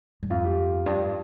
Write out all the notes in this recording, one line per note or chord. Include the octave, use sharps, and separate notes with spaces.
G2
F2 F4
G4
G2